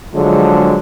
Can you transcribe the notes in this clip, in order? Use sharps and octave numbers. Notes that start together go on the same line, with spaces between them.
D3 F3 F#3 G#3